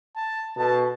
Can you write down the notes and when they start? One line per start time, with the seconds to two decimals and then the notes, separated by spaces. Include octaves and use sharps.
0.16 A5
0.56 B2 A4 A5